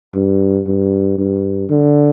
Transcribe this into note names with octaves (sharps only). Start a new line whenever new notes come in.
G2
G2
G2
D3